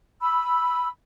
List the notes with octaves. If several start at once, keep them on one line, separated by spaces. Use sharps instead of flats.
B5 E6